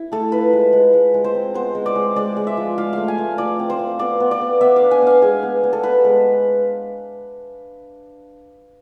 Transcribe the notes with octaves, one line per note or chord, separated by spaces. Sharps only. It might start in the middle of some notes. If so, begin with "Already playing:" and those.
Already playing: E4
A3 A4
F4 B4
G#3
G#3
G#3
G#3
C5
C4
B3 C5
G#3
D5
G#3
G#3 D5
G#3
E5
F3
F4 F5
A3 F5
G#5
A3
F4 D5
C4
C5
C4
B3 D5
B3
D5
B3
B3 E5
F5
D4
G#5
B3 F5
G#3 G#4
B3
B3
A4
B3 B4
G#3